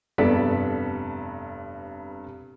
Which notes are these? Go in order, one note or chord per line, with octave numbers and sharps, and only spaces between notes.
F1 G2 B3 A4 D5 B6